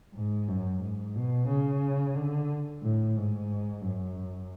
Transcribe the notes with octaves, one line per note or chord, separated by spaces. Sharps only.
G#2
F#2
G#2
B2
C#3
D3
A2
G#2
F#2